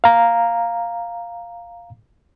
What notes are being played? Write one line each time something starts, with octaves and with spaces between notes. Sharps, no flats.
F5 A#5